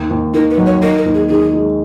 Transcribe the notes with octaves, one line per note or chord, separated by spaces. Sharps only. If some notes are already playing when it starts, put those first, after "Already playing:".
Already playing: D#2
D#2
D#3 A#4
B4
F#3
C#5
D#4 A#4
A#4
D#2
G#4
D#3 G#4
G#3